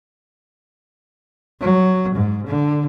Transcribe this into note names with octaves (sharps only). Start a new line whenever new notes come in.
F#3
G#2
D3